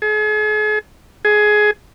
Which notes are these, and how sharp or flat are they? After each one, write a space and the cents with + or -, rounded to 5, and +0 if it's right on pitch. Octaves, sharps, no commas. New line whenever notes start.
G#4 +40
G#4 +15